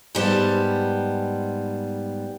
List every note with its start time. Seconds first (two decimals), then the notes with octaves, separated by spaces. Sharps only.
0.15 G#2 G3 B3 A5